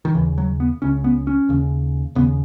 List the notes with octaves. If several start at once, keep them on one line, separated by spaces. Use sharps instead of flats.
D#3
D#2 C#3 E3
F#3
B3
C#2 C#3 C#4
B3
C#4
D#2 C#3
D#2 C#3 B3